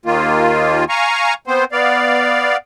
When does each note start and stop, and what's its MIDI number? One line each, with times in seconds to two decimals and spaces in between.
0.06 0.85 39
0.06 0.85 51
0.06 0.85 58
0.06 0.85 65
0.89 1.34 77
0.89 1.34 80
0.89 1.34 82
0.89 1.34 85
1.47 1.64 59
1.47 1.64 60
1.47 1.64 72
1.72 2.57 59
1.72 2.57 74
1.72 2.57 77